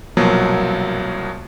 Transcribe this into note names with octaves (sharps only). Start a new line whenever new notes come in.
C2 B2 F3 F#3 A#3